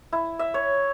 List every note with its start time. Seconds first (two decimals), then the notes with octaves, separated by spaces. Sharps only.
0.12 E4
0.39 E5
0.54 C#5